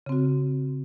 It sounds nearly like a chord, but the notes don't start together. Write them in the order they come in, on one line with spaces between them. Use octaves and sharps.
C#3 C4 F#4